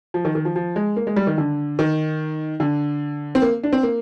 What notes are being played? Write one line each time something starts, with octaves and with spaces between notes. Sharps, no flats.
F3
D#3
D#3
F3
F3
G#3
A#3
G#3
G3
D#3
D3
D#3
D3
C4
A#3
D4
C4
A#3